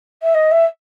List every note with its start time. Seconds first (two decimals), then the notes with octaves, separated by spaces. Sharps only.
0.22 E5
0.34 D#5
0.51 E5